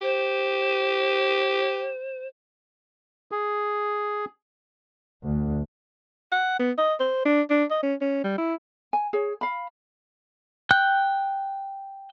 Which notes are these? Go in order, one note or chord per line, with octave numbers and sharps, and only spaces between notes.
G4 C5
G#4
D2
F#5
B3
D#5
C5
D4
D4
D#5
C#4
C#4
G3
E4
G#5
G#4 C#5
F5 B5
G5 F#6 G6